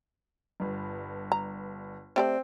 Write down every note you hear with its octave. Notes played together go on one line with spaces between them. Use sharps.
G1 G2
A#5
A3 C4 G4 D5